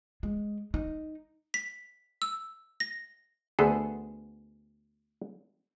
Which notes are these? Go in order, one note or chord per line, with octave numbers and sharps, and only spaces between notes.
G#3
D#4
B6
E6
A#6
D2 B3 G#4 A4